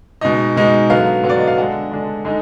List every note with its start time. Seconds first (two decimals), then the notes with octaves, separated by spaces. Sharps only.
0.21 B2 G#3 D#4 D#5
0.56 B2 G#3 D#4
0.90 D3 F#3 B3 F5
1.23 D3 F#3 B3
1.29 D5
1.38 D#5
1.47 F5
1.58 D3 G#3 D4 F#5
1.91 D3 G#3 D4
2.25 D3 G#3 D#4